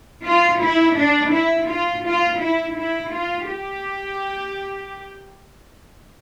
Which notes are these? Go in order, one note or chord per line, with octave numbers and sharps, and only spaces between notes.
F4
E4
D4
E4
F4
F4
E4
E4
F4
G4